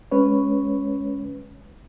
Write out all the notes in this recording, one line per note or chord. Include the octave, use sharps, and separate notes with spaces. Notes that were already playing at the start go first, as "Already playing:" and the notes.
G#3 C#4 B4 C#5